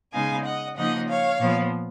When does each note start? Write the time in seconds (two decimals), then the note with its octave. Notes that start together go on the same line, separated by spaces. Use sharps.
0.13 C#3 G#3 B3 D#4 F5 G#5
0.44 D#5 F#5
0.76 C#3 F3 A#3 D#4 D#5 F#5
1.08 C#5 F5
1.40 A#2 F3 B3